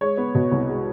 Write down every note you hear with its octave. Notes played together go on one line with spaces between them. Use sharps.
G#3 C#5
B3
B2
C2
G#3